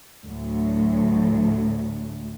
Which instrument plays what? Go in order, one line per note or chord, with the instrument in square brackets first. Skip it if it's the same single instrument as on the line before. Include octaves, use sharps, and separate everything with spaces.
[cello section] D2 A2 F#3